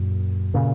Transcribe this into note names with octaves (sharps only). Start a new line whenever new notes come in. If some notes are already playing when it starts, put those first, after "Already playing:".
Already playing: F#2 A#2
A#2 C#3